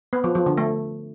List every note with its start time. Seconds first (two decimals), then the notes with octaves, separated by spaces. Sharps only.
0.13 B3
0.24 F3
0.35 F3
0.46 D3
0.57 A3